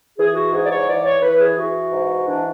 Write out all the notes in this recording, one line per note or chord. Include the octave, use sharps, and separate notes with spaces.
E3 G#4
F#4
G#2 G#4
D5
C#5
E3 D5
C#5
E3 B4
G#4
E3 F#4
G#2
E3 D4